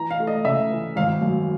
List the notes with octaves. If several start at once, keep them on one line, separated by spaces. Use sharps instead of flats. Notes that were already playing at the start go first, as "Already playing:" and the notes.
Already playing: E3 A#5
F5
A3
D#5
C#3 E5
E3
G#1 F5
F#2